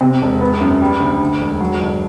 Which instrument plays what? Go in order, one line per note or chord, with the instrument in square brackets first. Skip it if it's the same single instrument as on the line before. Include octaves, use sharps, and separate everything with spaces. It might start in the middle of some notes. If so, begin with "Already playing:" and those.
[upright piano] C3
E1
B3
F#2
G3
D2
D3
E1
F#3
G1